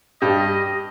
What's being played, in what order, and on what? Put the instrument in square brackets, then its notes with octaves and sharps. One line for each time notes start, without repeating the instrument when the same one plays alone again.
[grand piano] G2 G3 [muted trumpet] D#5